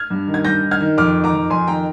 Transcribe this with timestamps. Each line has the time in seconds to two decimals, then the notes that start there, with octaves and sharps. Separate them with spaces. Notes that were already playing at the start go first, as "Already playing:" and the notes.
Already playing: F6 G#6
0.10 G2
0.28 D#3
0.34 G#6
0.45 G2 G6 A#6
0.63 D#3
0.71 F6 G#6
0.80 D#3
0.98 F2 D6 F6
1.16 D#3
1.24 A#5 D6
1.33 F2
1.50 F2 G#5 C6
1.67 D#3 G5 A#5